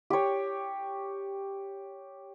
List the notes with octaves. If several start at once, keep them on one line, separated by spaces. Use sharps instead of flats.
G4 C#5